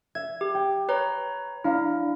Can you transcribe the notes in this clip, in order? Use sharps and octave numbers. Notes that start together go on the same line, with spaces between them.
E5 G#6
G4
G5
B4 C#5 A#5
D4 E4 F5 A#5